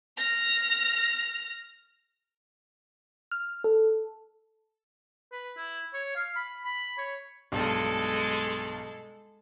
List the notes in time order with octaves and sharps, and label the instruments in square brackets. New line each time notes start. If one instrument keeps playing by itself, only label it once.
[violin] F6 A#6
[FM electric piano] F6
A4
[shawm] B4
E4
C#5
F5
B5
B5
C#5
[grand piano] B1 G2 [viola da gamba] G#3 A4